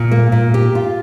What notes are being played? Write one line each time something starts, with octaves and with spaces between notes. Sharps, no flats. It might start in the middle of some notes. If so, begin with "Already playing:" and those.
Already playing: A#2
A#3
A#2
G4
F4